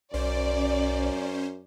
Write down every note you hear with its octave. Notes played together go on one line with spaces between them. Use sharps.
B1 F#2 C#4 C5 D5